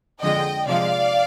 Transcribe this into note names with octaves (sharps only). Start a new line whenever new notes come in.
F2 D3 F3 G#3 D#5 G5
C3 F3 G#3 D5 F5